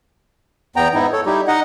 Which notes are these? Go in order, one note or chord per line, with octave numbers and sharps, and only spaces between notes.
E2 B3 G5 A#5
G#2 B3 D#4 E4
A4 C#5
G3 D#4 E4 G4
D#4 D#5 F#5